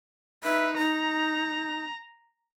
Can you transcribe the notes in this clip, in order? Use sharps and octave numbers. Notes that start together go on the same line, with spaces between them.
D#4 B4 E5
D#4 A#5